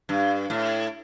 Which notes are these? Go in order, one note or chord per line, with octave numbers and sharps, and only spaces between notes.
G2
A2